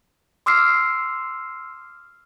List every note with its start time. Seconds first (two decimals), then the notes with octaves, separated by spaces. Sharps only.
0.46 C6 D6 E6 F6 C7